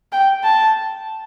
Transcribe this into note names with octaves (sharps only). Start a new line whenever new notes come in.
G5
A5